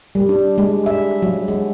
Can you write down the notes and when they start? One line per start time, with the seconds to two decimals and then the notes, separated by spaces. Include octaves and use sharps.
0.15 G3
0.29 D4
0.58 G#3
0.86 E5
1.22 F#3
1.48 G#3